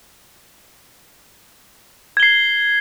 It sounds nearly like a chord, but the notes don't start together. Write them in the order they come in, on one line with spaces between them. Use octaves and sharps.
G#6 G7 C7